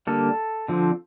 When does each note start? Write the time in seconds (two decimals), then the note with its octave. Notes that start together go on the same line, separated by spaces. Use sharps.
0.07 D3 G3 A#3 A4
0.68 D3 F3 C4